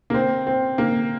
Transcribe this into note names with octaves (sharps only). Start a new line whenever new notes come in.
A#3
C4
C4
A#3